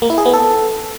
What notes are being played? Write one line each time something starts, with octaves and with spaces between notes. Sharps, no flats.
A#3
E4
G#4
B3
A4